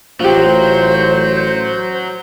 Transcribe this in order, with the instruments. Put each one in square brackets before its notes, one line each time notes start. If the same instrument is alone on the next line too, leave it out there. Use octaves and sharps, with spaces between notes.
[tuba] A1 [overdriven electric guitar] F#3 [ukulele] F4 G4 [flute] C5